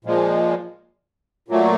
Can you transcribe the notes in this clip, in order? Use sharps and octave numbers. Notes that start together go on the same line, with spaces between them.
A#2 F3 G#3
A#2 F#3 A3